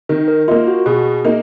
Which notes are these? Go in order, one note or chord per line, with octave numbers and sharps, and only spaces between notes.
D#3 A#4
A#4
A#3 D#4 F4
F#4
B2 G#4
A#3 D#4